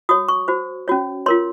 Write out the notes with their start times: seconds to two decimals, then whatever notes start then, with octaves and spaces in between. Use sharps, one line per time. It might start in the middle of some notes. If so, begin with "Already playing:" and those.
0.09 F#4 C#5 D#6
0.28 C#6
0.48 F#4 C5
0.88 C#4 F#4 C#5
1.26 F4 A#4 C#5 C6